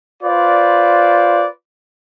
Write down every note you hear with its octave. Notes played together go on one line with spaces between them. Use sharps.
F4 B4 C5 D5